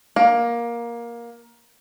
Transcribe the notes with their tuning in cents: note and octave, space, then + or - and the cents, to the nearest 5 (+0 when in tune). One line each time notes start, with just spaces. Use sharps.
A#3 +15